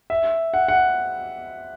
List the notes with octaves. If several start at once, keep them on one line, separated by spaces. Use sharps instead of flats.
E5
F#5
F#5